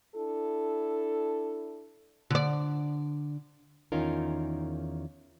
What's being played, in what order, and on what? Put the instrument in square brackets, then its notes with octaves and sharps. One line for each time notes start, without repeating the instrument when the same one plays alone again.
[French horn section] D4 E4 A4
[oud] D3 D5
[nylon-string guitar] E2 D#3 C#4 D#4 F4 A#4